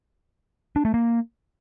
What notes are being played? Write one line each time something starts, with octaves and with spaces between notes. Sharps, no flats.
D4
A3
A#3